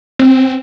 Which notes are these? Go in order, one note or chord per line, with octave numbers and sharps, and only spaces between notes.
C4